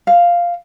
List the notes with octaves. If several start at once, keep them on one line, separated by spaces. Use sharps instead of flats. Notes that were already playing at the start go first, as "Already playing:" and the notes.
F5